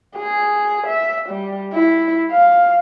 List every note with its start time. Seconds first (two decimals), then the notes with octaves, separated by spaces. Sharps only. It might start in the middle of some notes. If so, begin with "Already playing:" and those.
0.17 G#4
0.87 E5
1.29 G3
1.74 E4
2.32 F5